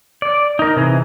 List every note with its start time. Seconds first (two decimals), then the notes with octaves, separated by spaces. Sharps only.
0.22 D5
0.59 D#4 A#4
0.76 C3 E3 G#4